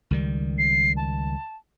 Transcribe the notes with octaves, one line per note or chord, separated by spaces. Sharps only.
C#2 D#3 G3
C7
A5